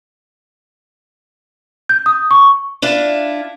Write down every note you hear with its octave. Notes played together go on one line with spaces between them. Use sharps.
G6
D#6
C#6
D4 E4 F4